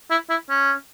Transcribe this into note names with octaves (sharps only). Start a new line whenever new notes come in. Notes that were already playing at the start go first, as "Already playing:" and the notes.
E4
E4
C#4